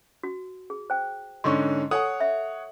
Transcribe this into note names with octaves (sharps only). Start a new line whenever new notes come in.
F#4
G#4
C5 G5
G#2 D3 C#4 C6 C#6
A4 C#5 F#5 G#5 D#6
E5